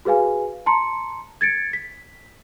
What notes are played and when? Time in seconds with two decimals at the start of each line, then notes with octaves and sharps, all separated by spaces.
0.05 F#4 G#4 B4 F5 G#5
0.66 A5 A#5 C6 C#7
1.41 G#6 A6 C#7 D7
1.73 B6